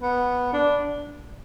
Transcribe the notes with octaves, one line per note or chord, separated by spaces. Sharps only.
B3
D4